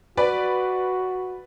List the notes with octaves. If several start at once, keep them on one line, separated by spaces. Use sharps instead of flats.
F#4 B4 D5